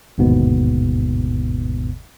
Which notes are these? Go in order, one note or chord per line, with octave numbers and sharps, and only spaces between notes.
G1 D#2 G#2 B2 B3